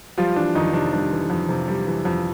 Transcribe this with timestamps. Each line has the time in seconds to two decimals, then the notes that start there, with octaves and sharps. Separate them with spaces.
0.17 F3 G3 F4
0.36 E3 D4
0.55 F2 D#3 D#4
0.73 C3 D4
0.93 G3 D4
1.11 E3
1.30 F2
1.49 C3
1.68 G3
1.87 E3
2.05 F2